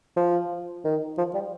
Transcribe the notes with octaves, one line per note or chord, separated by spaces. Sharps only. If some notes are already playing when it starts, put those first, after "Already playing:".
F3
D#3
F3
G3